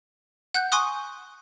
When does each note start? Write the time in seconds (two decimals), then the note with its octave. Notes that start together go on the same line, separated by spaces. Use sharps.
0.54 F#5 F#6 G6
0.72 G#5 C6 C#6 D#6 F#6